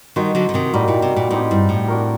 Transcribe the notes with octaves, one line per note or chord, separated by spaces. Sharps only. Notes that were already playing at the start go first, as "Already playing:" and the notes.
D#3 G3 D#4 F#4 C5 D#5
D3 F#3
D3
C3 D#3
A2 G3 A#3 D#4 F#4
A#2
C3
A#2
A2 C4 D#4 G4
G2
A2
D4 F#4 A#4